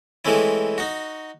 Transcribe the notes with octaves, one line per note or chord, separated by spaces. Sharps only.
E3 G#3 A3 C4 C#4 E4
D#4 F#4